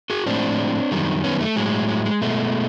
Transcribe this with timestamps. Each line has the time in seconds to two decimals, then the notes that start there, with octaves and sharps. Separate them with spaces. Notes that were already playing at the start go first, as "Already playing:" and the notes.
0.10 F#4 G#4
0.26 A2 F3 G#3 C4 D4
0.91 F#2 D#3 G3
1.24 B3 C#4
1.40 A3
1.56 A2 F#3 G#3
1.88 G#3
2.05 G#3
2.22 B2 G#3 A3